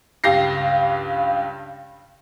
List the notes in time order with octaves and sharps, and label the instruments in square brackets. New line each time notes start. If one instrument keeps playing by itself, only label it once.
[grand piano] C#2 G2 G4 A#6 C7